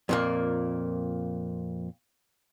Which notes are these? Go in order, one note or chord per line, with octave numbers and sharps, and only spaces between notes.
F2 A#2 A#3